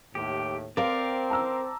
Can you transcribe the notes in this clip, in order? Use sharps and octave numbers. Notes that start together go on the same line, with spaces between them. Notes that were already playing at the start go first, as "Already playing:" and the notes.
D#2 A2 G4
C4 A#4 D5 F5
A5 A#5 E6